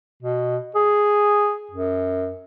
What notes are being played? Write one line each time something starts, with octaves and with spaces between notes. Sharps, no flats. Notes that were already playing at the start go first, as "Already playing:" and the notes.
B2
G#4
F#2